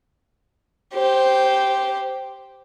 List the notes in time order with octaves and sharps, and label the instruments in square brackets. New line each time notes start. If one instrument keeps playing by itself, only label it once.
[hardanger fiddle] G4 C5